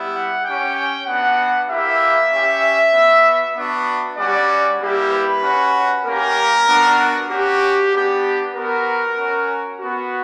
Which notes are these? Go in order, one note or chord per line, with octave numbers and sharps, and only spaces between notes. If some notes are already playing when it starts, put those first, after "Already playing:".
Already playing: G3 B3 E4
F#5
C#4 G4 G5
G5
B3 D4 F#4 F#5
A#3 E4 G4 E5
C#4 G4
B3 F#4
B3 D4 F#4
G3 C#4 F#4 D5
G3 A#3 E4 G4
B4
C#4 F#4
A#3 C#4 G4 A#4
B3 D4 F#4
C#4 F#4 G4
B3 D4 G4
B3 F#4 A#4
C#4 F#4
B3 F#4